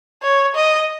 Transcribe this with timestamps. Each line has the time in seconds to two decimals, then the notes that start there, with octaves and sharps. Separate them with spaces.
0.23 C#5
0.55 D#5